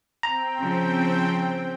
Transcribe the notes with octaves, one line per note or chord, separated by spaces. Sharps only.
C4 G5 A#5
C#3 F3